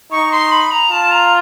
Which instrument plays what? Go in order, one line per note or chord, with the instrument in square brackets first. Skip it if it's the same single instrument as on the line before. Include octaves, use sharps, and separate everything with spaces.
[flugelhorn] D#4 [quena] C#6
[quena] C6
B5
A#5
[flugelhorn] F4 [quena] A5
[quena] A#5